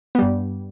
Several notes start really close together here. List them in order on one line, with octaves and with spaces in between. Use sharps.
B3 G3 G2